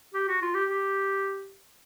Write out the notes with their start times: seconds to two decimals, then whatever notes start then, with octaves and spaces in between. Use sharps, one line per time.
0.14 G4
0.28 F#4
0.42 F4
0.54 G4
0.69 G4